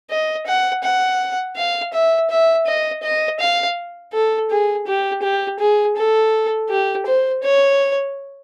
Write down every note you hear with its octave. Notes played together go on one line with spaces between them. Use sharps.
D#5
F#5
F#5
F5
E5
E5
D#5
D#5
F5
A4
G#4
G4
G4
G#4
A4
G4
C5
C#5